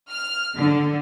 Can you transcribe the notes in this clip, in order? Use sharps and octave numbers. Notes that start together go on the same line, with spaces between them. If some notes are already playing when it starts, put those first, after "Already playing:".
F6
D3